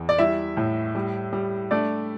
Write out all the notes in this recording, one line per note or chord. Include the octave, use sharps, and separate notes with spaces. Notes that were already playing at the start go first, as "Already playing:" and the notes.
Already playing: E2
D5
G3 E4 E5
A2
G3
G3
A3 D4 D5